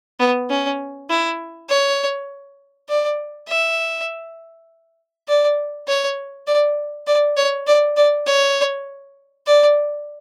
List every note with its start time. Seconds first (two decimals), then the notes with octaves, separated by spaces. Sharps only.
0.19 B3
0.50 C#4
1.10 E4
1.69 C#5
2.89 D5
3.49 E5
5.28 D5
5.88 C#5
6.47 D5
7.07 D5
7.37 C#5
7.67 D5
7.97 D5
8.26 C#5
9.47 D5